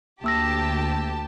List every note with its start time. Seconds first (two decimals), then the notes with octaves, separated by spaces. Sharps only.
0.24 D2 A#3 G4 A5 E6 A#6